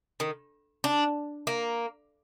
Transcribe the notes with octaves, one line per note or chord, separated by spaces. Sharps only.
D#3
D4
A#3